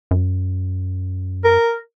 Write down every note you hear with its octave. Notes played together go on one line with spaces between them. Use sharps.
F#2
A#4